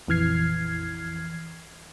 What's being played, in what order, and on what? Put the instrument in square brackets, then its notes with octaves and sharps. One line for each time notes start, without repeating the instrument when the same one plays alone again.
[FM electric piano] A#1 F2 E3 F6 G#6 C7